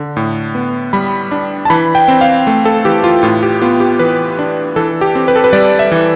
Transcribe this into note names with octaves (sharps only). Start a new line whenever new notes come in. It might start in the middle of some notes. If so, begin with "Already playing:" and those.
Already playing: D3
A2
B3
G3 B5
D4
A5
E3 B5
G5
C4
F5
A3
A4
E3 G4
F4
A2 F4
G4
B3 F4
G4
E3 B4
D4
E3 A4
G4
C4
B4
A4
B4
G3 D5
E5
E3